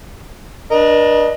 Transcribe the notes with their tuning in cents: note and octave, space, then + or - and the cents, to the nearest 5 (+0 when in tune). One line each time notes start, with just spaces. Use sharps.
D4 +10 B4 -45 D#5 +0